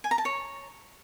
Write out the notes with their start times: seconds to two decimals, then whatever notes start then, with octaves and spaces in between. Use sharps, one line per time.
0.04 G#5
0.11 A#5
0.18 A5
0.25 C#5